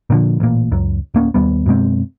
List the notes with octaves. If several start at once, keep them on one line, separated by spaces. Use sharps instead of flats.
A#2 D3 F3
A1 A#2
C#2 F#2
D1 A#3 C#4
D#2 G3 B3
F#2 B2 G#3 C4